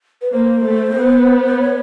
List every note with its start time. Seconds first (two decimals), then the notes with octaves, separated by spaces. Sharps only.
0.22 B4
0.32 A#3 C5
0.63 A3
0.95 B3
1.60 C#5